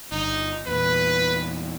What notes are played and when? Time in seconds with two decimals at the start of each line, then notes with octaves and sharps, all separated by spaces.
0.12 G1 D#4
0.67 E2 A#2 B4